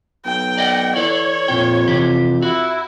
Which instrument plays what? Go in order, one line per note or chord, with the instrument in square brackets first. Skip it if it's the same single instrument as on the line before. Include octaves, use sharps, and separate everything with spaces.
[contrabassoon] B1 [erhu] G5
[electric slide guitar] D5 D#5 F#5
[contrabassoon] E3 [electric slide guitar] A4 D5 [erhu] C#5
[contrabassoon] F2 [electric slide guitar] A#2 G5
[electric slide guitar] C3 E3 G4
[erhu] E4 [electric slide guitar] F#4